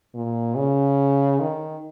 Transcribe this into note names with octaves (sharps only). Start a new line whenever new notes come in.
A#2
C#3
D#3